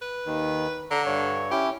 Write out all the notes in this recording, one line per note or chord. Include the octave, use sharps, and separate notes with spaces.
B4
D#2 D#3
D3 A#5
G2 C#5
C#4 E4 G4